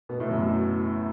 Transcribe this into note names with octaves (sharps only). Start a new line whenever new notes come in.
B2 B3
A2 A3
F#2 F#3